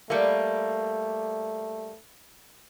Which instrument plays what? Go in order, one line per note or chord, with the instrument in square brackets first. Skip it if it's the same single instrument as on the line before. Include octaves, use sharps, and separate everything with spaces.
[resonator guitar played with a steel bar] G3 A#3 [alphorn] A3 [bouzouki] B4 D5 E5